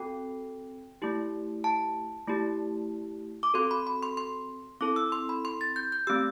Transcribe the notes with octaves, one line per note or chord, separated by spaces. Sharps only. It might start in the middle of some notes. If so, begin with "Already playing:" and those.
Already playing: C4 F#4 A4 G5
A3 E4 G4
A5
A3 E4 G4
D6
C4 F#4 A4 C6
B5
B5
C6
C6
C4 E4 A4 D6
E6
C6
B5
C6
A6
G6
G6
A3 C4 G4 E6